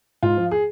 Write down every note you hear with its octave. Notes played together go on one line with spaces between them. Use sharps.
G#2 F4
F3
G#4